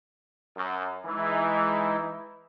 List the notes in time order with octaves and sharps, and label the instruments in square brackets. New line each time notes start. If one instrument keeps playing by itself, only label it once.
[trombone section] F#2
[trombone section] E3 [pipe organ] G#3 D#4 E4